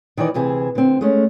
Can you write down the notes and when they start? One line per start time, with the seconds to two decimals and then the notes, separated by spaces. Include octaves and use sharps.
0.17 D#3 E3 D#4 D5
0.34 D2 C3 E3 G#4 E5
0.75 D3 C4
1.01 G#3 A3 C#4